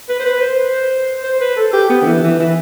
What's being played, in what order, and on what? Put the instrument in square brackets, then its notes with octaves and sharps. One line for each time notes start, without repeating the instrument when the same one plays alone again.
[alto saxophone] B4
C5
B4
C5
C5
B4
A4
G4
B3
D3
E3
E3
E3